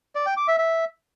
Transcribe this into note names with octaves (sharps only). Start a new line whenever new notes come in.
D5
G5
D6
E5
E5